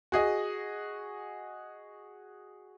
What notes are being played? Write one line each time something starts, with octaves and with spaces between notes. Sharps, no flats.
F#4 G#4 D#5